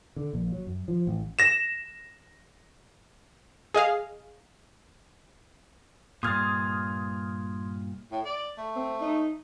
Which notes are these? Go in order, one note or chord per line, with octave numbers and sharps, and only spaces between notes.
D3
A#1
F#3
F#2
F3
A1
A#6 E7
G#4 D#5 F5
G2 A#2 C6 D#6 F6 G#6 A6
A2
D5
A3
C4
D#4